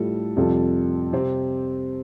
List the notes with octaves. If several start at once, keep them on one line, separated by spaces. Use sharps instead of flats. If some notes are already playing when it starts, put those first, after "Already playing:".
Already playing: A2 G3 F4 A4
F2 C3 G3 F4 A4
C3 G3 C4 G4